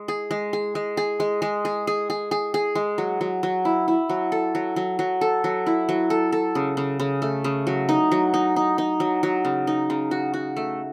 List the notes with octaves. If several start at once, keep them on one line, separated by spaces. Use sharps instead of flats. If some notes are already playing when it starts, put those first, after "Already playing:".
Already playing: G#3
G#4
G#3
G#4
G#3
G#4
G#3
G#3
G#4
G#4
G#4
G#4
G#4
G#3
F#3
F#3
F#3
E4
E4
F#3
A4
F#3
F#3
F#3
A4
F#3
E4
F#3
A4
A4
C#3
C#3
C#3
A3
C#3
F#3
D#4
F#3
D#4
D#4
D#4
F#3
F#3
C#3
D#4
C#3
F#4
F#4
A3